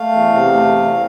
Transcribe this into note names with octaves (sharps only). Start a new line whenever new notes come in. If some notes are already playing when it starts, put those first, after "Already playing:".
Already playing: A3 F5
E2
C3
A3
E2